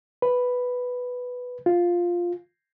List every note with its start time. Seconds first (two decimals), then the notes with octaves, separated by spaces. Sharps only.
0.22 B4
1.66 F4